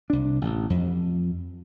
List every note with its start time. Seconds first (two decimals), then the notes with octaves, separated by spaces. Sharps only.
0.10 C2 D4
0.41 A1
0.70 F2